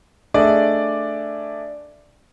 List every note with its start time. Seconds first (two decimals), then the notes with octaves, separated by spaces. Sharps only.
0.34 A3 D4 G#4 D5 D#5